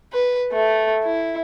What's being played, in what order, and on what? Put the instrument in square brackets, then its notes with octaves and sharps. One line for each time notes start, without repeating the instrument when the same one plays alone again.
[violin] B4
A3
E4